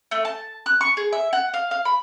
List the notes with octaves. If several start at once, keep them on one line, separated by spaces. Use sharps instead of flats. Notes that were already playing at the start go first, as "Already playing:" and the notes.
A3
A5
F#6
C#6
G#4
E5
F#5
F5
F5
B5